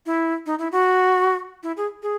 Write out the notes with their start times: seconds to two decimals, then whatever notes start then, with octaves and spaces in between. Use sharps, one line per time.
0.06 E4
0.46 D#4
0.59 E4
0.72 F#4
1.63 E4
1.77 G#4
2.02 G#4